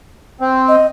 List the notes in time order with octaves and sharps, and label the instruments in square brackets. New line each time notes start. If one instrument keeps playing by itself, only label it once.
[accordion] C4
[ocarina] D#5